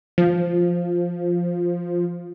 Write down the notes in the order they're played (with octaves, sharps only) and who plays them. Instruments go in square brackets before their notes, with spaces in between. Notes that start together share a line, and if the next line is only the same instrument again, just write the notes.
[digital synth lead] F3